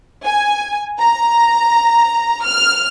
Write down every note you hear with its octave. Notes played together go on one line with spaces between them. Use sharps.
G#5
A#5
F6